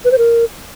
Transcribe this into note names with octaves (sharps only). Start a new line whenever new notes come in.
B4
C5
A#4